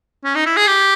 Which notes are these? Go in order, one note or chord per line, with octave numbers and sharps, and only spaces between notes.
C#4
D#4
E4
G#4
G4